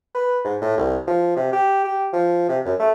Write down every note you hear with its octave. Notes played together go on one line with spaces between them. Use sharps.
B4
G#2
A2
C2
F3
C3
G4
G4
F3
C3
F#2
A3